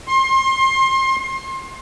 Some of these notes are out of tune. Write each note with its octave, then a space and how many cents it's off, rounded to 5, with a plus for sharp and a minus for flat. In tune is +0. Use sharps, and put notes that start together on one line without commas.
C6 +30